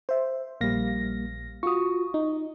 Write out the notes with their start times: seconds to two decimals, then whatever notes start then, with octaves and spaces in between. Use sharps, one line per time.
0.09 C5 E5
0.61 A#1 G3 A#3 F5 A#6
1.63 F4 F#4 C#6 D#6
2.14 D#4